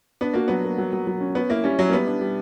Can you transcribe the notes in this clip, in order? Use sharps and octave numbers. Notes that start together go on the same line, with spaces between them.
B3 D4
A#3 F#4
F#3 B3
A#3
F#3
F#3
F#3
C#4
B3 C#4
A#3 E4
G3 C#4
F#3 E4
A#3
G3 B3
D4
G3